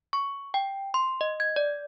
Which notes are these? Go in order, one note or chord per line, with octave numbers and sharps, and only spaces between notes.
C#6
G5
C6
D#5
G#6
D5